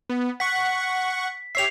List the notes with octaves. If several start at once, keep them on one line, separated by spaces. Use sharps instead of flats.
B3
F#5 C#6 B6
G4 C#5 E5 C7 F7